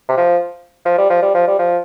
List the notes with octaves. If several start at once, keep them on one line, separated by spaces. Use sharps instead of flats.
C3
F3
F3
G3
F3
G3
F3
G3
F3